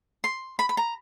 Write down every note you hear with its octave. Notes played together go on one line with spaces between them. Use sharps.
C6
B5
B5
A#5